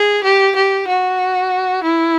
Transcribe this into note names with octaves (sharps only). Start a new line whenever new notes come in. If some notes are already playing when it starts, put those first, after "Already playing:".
Already playing: G#4
G4
G4
F#4
E4